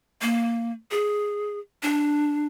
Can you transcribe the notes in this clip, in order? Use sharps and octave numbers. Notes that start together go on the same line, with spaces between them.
A#3
G#4
D4